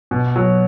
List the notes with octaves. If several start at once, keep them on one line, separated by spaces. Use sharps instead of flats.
B2
F#3